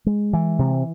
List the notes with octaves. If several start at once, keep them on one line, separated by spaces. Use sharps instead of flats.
G#3
E3
C3